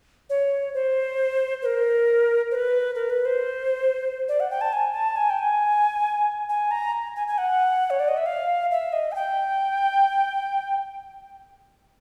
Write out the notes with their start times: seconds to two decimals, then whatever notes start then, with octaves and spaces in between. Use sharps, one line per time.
0.30 C#5
0.74 C5
1.62 B4
1.66 A#4
2.51 C5
2.55 B4
2.95 A#4
3.10 B4
3.25 C5
4.29 D5
4.40 F#5
4.51 G5
4.61 A5
4.73 G#5
4.94 A5
5.16 G#5
5.30 G5
5.39 G#5
6.49 G#5
6.71 A#5
7.16 G#5
7.28 G#5
7.38 F#5
7.90 C#5
8.00 D5
8.08 D#5
8.17 E5
8.26 F5
8.71 E5
8.93 D#5
9.12 G#5
9.15 G5